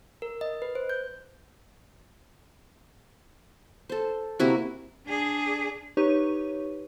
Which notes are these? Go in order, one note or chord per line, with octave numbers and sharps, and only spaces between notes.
A#4
D#5
B4
C5
G6
A4 C5
C3 A#3 E4 F#4
D4 G#4
D#4 G4 B4 C#5 C#6 D#7